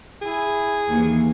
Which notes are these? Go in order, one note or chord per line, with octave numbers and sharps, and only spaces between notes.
E4 G#4
D#2 E3